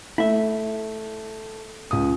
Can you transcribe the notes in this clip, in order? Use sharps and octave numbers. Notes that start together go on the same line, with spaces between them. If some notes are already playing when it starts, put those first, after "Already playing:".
A3 E4 E5
C#2 D#6